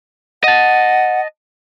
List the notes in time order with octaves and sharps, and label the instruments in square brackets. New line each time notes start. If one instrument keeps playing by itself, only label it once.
[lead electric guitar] D#5 A5 [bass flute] F#5